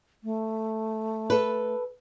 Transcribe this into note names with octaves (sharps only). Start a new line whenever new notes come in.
A3
A4 B4